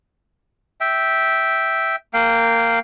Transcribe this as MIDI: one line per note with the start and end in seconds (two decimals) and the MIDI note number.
0.81 1.96 76
0.81 1.96 79
2.14 2.79 58
2.14 2.79 77
2.14 2.79 79